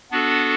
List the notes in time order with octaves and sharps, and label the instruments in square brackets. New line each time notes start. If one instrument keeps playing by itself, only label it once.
[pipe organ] B3 D4 F#4 A4